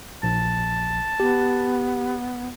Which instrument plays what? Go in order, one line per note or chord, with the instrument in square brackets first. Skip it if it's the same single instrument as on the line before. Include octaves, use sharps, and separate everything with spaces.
[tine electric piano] A#1 [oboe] A5
[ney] B3 [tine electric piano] G4